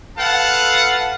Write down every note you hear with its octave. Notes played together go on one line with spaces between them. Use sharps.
F4 A4 B4 F5 F#5 A5